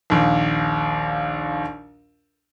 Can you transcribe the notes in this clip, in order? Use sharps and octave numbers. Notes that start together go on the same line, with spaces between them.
A#1 D#2